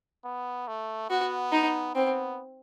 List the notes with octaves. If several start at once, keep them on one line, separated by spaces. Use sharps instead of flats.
B3
A3
B3 F#4
D#4
B3 C4